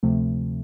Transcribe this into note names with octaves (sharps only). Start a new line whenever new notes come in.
D2 C3 F3 A3